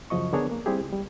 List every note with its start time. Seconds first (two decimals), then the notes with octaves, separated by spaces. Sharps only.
0.10 F#2 C#3 F3 D#5 C#6
0.33 D3 B3 D4 G#4 A#4 C#5
0.51 A#3
0.66 G3 C4 E4 G4 G#4
0.81 C#2
0.93 G3